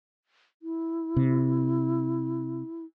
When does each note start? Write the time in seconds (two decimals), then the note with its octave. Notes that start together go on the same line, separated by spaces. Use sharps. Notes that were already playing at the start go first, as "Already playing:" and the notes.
0.63 E4
1.16 C3